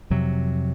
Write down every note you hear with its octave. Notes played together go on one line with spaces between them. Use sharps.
F2 C3 F#3